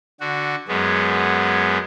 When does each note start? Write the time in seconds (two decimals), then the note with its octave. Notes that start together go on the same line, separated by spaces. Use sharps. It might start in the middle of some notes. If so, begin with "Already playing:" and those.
0.20 D3 F#4
0.68 F#2 G#3 B3